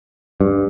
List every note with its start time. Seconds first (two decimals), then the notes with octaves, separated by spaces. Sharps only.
0.41 G2